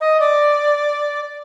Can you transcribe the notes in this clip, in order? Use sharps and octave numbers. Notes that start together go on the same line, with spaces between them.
D#5
D5